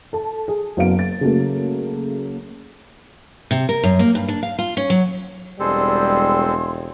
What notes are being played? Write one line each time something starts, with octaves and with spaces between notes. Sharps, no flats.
A4 A5
G#4
F#1 F#3 B3 F5 D7
A6
C#3 F#3 A3 A#3
C3
A#4
F#2
A#3
G2
D4
F5
F4
C#4
F#3
E1 G3 G#3 C4 A4 C6